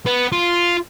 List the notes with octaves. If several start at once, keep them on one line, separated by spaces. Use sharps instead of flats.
B3
F4